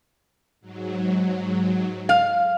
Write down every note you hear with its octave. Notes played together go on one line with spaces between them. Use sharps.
G#2 F#3
F5